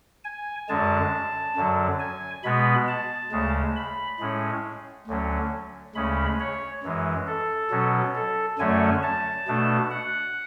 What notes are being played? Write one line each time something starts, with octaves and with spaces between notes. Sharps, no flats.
G#5
F#2 D3 G#3 A5
F#2 D3 F#3
G#5
B2 G#3 B3 B5
A5
D2 C#3 G#3
B5
A2 G#3 C#4
D2 D3 F#3 C#4
D2 C#3 G#3 C#4 B5
C#5
F#2 E3 G#3
A4
B2 F#3 C#4
A4
F#2 D3 F#3 A3 C#4 G#5
A5
B2 A3 D4
F#5